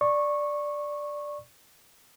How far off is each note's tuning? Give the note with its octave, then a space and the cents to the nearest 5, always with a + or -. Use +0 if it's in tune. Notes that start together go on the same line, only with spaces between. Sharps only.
D5 +0 C#6 -15